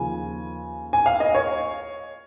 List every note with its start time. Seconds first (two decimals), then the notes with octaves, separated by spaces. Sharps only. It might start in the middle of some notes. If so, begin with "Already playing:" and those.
Already playing: D#2 C#3 F3 G#5
0.93 G#5
1.06 F5
1.20 D#5
1.35 C#5